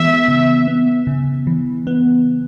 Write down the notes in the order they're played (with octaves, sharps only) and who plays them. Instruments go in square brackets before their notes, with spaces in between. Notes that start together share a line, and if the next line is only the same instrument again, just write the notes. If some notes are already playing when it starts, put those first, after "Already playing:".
Already playing: [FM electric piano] E3 B3 [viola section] E5
[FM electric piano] C#3
B3
C#3
E3
B3